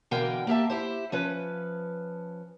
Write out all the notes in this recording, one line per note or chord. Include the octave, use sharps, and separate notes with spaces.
B2 D3 E3 A#4 F5 G5
A#3 G4 E5 A5
E4 G4 C5
F3 C#4 B4